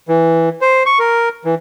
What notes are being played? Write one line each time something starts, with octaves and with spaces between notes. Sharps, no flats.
E3
C5
C#6
A#4
E3